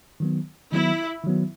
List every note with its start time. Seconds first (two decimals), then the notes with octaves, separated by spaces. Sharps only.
0.20 D#3 F#3 B3
0.72 D#3 F#3 B3 E4
1.24 D#3 F#3 B3